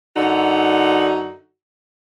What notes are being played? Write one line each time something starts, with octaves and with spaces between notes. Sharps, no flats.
F#2 D3 D#4 F#4